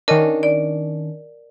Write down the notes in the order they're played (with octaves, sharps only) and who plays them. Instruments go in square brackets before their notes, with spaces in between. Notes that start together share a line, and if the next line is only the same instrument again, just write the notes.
[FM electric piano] D#3 C#4 D4 [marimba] A#4 D#5
[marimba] D5